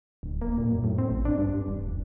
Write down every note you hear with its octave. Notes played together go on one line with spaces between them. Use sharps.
D1
A#3
A#2
F#2
A2
C4
A1
D4
G2
G2
D#1
E1